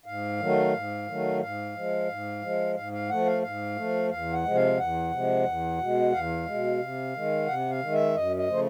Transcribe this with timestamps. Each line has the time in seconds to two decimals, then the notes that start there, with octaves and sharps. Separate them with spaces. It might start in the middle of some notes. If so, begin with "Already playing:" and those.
0.06 G#2 F5
0.40 D#3 F#3 A3
0.73 G#2
1.07 D#3 F#3 A3
1.41 G#2 F5
1.75 F3 G#3
2.09 G#2
2.42 F3 G#3
2.76 G#2 F5
2.92 F5
3.10 F3 A3 F#5
3.26 F5
3.42 G#2 F5
3.76 F3 A3
4.10 E2 F5
4.33 F#5
4.44 C3 F3 G#3
4.55 F5
4.78 E2 F#5
5.11 C3 F3 G#3
5.46 E2
5.78 B2 G#3
6.12 E2 F5
6.46 B2 G#3
6.80 C3
7.14 D#3 G#3
7.47 C3 F#5
7.70 F5
7.82 D#3 G#3
7.92 E5
8.15 F#2 D#5
8.37 D#5
8.48 C#3 F3 A3 C5